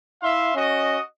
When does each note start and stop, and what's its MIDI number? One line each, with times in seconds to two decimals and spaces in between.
0.21 0.53 64
0.21 0.53 76
0.21 0.53 77
0.21 0.53 84
0.55 0.98 61
0.55 0.98 66
0.55 0.98 75